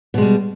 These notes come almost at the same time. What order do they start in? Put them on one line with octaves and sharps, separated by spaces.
B2 G#3 G3